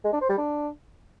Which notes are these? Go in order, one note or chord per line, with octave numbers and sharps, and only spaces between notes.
G#3
D4
C5
G3
D4